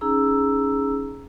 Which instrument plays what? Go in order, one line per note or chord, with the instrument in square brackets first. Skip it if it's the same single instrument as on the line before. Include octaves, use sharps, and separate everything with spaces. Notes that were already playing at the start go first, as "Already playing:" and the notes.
[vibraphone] C#4 D#4 G#4 A#5 E6